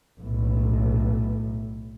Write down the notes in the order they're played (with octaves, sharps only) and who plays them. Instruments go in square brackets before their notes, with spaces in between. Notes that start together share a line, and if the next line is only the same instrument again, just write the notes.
[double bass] B1 A2